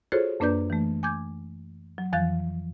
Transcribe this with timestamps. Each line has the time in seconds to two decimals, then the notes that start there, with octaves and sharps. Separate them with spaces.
0.12 F4 F#4 G#4 A4 C5 C#5
0.40 F#2 A#3 D4 B4 D5 G6
0.70 E3 A3
1.03 G#5 D6 G6 G#6
1.98 F#3
2.13 F2 E3 F3 F5 F#6 A6